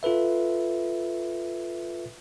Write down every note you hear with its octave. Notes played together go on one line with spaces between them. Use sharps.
F4 A4 B4 E5